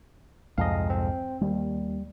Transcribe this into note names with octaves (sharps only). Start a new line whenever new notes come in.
C2 F2 G#2 D#5 F5
C4
D#2 G3